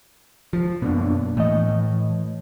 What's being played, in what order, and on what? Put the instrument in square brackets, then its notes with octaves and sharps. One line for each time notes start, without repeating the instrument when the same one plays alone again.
[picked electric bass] F3
[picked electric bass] F#2 B2 [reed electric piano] A#3 D4
[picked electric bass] A2 [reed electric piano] E3 D#5